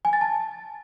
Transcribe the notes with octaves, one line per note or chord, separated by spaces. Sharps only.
G#5
A6
A5